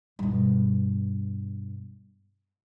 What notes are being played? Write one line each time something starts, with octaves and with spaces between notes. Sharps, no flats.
G2 B2